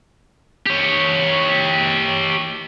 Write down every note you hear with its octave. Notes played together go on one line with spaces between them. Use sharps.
G4 C#5